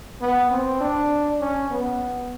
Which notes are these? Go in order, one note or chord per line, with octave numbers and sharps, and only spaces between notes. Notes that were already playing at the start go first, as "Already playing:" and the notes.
B3
C4
D4
C#4
B3